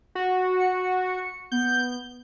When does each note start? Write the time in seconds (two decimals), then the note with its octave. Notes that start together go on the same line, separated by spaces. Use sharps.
0.15 F#4
0.59 C#7
1.52 B3 G6